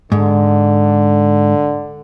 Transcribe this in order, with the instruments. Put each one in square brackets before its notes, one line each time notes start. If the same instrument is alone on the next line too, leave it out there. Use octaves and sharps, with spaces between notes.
[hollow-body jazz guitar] G#2 [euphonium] D3